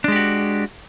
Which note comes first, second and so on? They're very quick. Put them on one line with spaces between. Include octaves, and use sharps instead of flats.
D4 G#3 G4 F#4